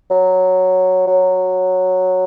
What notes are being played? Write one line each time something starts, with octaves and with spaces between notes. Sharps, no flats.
F#3
F#3